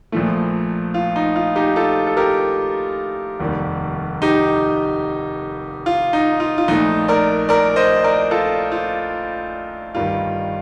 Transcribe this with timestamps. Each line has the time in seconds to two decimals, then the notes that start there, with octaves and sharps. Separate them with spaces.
0.12 A#1 A#2 F3 A3
0.94 F4
1.16 D#4
1.36 F4
1.56 D#4 G4
1.76 F4 A4
2.07 A4
2.17 G4 A#4
3.40 F1 D#2 D#3 G3
4.22 D#4 G4
5.86 F4
6.13 D#4
6.40 F4
6.58 F4
6.68 A#1 A#2 A3 D#4
7.08 A#4 D5
7.49 A#4 D5
7.76 C5 D#5
8.04 A#4 D5
8.31 F4 A4
8.72 F4
9.95 G1 G2 D#3 G3 F4